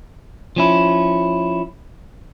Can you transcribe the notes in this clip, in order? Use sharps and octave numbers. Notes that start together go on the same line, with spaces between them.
F3 C#4 E4